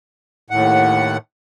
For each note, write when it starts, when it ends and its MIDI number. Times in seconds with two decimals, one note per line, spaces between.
0.50 1.17 39
0.50 1.17 45
0.50 1.17 78